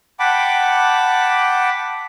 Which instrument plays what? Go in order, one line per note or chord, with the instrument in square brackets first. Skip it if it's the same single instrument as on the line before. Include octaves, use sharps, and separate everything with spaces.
[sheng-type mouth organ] F#5 G5 A5 B5 D6